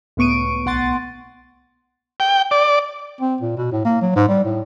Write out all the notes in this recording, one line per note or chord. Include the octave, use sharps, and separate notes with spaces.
C#2 A2 B3 C#6 D7 D#7
B1 F#5 C6 A6
G5
D5
C4
A#2
B2
A2
A#3
F#3
G#2
G3
A2